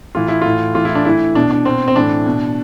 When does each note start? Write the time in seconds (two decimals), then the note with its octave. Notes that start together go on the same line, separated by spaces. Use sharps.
0.15 A2 E3 F4
0.28 E4
0.41 A2 E3 F4
0.75 A2 E3 F4
0.85 E4
0.95 D4
1.05 A2 E3 E4
1.35 B2 D4
1.51 D4
1.65 B2 C4
1.88 C4
1.96 A2 E3 D4
2.26 B2